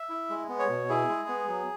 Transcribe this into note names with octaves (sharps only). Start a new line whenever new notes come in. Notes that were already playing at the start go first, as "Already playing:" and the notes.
Already playing: E5
E4
G#3
B3
C#5
B2
E4 G#4
G#3
B3
F#3